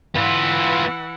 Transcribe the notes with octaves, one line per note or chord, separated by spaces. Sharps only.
E3 B3 F4 F#5